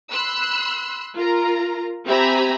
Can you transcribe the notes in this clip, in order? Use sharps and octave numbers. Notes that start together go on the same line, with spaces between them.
B5 C6 E6 F#6
F4 A#4 A#5
C4 G4 E5 G#5 A#5 B5